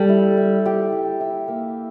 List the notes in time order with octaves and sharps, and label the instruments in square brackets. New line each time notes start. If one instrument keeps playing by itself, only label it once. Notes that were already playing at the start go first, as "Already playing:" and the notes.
Already playing: [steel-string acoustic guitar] G3 [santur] A4
[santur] E4
E5
G4
E4
E4
A#3